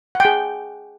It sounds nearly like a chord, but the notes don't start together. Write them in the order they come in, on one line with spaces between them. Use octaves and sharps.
F#5 G5 G#4